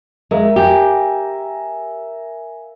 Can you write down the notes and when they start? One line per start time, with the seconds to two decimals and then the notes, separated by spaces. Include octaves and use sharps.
0.31 G#3 A#4 E5 F5
0.56 G4 G#5